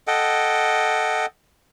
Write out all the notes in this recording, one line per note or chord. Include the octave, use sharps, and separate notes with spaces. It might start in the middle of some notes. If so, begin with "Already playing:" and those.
A4 D#5 F#5 G5